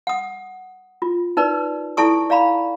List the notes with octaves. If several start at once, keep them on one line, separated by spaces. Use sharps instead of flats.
F#5 D#6
F4
D#4 A#4 B4 D5
E4 A4 D5 A5 C#6 D#6
D5 F5 A#5 B5